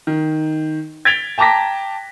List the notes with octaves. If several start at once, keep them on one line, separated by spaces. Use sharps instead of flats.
D#3
G#6 A6 B6 D7 F7 G7
G5 A5 A#5 D6 A#6 B6